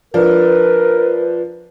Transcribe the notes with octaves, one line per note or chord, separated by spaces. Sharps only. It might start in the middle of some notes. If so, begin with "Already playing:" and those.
F3 D4 A#4 B4